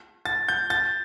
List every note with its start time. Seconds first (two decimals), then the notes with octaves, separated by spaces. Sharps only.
0.25 A6
0.49 G6
0.70 A6